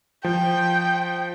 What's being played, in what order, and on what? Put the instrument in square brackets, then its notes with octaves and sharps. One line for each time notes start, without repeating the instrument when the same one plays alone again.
[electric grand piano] F3 [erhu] G5